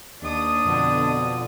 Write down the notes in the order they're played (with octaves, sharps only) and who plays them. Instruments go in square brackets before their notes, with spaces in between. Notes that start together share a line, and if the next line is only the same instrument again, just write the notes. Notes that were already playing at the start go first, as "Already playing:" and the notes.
[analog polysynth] D#2 [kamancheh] D4 D#6
[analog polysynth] F2 B2 D3